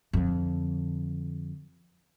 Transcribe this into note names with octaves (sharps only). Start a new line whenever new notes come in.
F2 D3